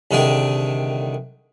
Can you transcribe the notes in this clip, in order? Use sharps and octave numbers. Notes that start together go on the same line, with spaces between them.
C2 D3 D#3 G#4